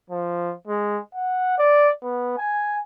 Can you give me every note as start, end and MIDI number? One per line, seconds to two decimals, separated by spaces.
0.10 0.53 53
0.68 1.00 56
1.15 1.57 78
1.58 1.90 74
2.03 2.34 59
2.38 2.78 80